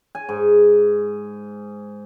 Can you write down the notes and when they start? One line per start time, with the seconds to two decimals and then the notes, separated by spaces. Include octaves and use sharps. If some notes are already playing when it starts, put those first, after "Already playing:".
0.15 G#5
0.29 G#2